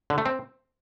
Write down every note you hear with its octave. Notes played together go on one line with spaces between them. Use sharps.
D3
A3
C4